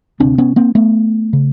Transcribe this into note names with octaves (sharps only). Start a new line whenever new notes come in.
D2 C3 C4 D4
B3 C#4
A#3 C4
A3 B3
C#3